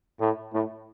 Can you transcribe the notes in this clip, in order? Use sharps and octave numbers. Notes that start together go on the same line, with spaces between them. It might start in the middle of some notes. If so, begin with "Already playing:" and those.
A2
A2